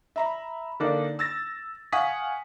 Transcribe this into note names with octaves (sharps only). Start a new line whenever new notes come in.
E5 A#5 B5
D3 A#3 D4 D#4 D5
E6 A6 A#6
F5 F#5 G#5 C#6 D#6 B6